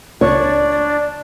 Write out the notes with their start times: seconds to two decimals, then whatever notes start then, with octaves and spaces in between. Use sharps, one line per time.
0.21 C#2 D4 C#5 D5